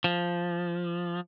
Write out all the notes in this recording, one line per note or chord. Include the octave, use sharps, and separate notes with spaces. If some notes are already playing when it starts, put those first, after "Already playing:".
F3